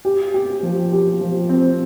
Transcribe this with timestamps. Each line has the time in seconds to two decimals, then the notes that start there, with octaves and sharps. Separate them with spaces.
0.05 G4
0.34 G4
0.63 F3
0.92 G4
1.21 F3
1.49 C4